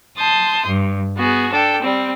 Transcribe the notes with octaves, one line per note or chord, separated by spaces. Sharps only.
A5 C6 D#6 G6
G2
B3 F#4 G#4
D4 A4 G5
G3 C4